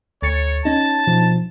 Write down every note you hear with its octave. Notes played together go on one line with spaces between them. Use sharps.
D2 C#5 A6 C#7
C#4 D#4 A5
B2 F3